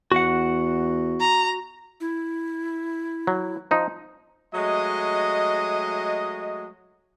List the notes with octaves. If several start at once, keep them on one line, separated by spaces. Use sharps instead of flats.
E2 F#4 F#5
A#5
E4
F#3
F3 D#4
F#3 G#3 A3 D#5